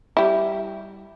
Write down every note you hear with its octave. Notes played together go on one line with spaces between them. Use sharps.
G3 E4